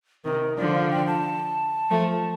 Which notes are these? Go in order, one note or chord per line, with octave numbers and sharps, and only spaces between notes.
C3 D#3 A#4
D3 F3 D5
F5
G5
A5
F3 A3